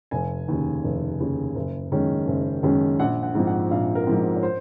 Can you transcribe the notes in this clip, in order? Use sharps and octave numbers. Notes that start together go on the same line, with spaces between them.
F1 G#5
D#2 C#3
F1
D#2 C#3
F#1
F#2 D#3 G#3 C#4
F#1
F#2 D#3 G#3 C#4
A#1 F#5
F#5
G#2 F3 C4
F#5
A#1 F5
A#4
G#2 F3 C4
C#5
C5